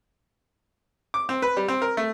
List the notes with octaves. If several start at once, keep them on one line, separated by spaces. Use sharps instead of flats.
D6
C4
B4
G3
C4
A#4
A3